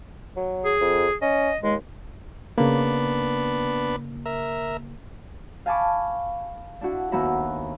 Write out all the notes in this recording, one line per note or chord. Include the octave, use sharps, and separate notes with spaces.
F#3
G#4
F2
C#4 D#5
D#2 G#3
C#3 A#3 B3 D4 B4
A#4 E5
F5 G#5 A5 B5 C#6 D6
D4 E4 F#4
D#2 B3 F#4 E5 A#5 B5